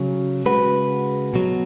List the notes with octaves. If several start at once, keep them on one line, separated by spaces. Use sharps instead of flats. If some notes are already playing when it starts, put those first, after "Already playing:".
Already playing: C#3 F#3
C#3 G#3 F#4 B4
B2 F#3